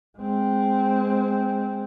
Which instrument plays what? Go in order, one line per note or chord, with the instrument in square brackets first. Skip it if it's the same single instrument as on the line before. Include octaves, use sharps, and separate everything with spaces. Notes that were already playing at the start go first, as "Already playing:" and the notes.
[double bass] G#3 C4